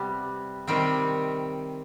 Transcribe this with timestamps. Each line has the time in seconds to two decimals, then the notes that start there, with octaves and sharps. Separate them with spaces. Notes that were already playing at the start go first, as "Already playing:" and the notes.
Already playing: C3 G3 B3
0.67 C3 D#3 G3 C4